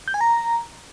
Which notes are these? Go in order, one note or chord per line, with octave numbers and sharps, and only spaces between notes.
G6
G#5
A#5